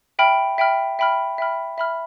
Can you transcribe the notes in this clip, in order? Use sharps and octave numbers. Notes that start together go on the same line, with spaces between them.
E5 G5 B5 F6
E5 G5 B5 F6
E5 G5 B5 F6
E5 G5 B5 F6
E5 B5 F6